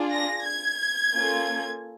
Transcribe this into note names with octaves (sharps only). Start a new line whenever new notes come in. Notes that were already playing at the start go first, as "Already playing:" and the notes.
Already playing: D4 F4 G#4
A#6
G#6
A#3 C#4 F4 A4